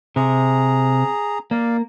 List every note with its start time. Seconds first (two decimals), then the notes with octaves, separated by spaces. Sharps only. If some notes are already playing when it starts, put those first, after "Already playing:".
0.16 C3 G#4 A#5
1.51 A#3 D5 F5